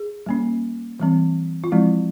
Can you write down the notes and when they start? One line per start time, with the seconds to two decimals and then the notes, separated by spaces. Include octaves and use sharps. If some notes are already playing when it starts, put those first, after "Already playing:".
Already playing: G#4
0.26 G3 A#3 C#4
1.00 E3 G3 C4
1.64 F4
1.72 F3 G#3 C4 E4